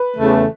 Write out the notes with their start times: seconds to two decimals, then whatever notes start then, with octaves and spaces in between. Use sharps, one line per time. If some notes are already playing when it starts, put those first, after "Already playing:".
Already playing: B4
0.17 E2 C#3 E3 A3